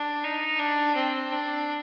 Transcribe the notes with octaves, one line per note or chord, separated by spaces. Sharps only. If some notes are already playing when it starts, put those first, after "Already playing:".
Already playing: D4
D#4
D4
C4
D4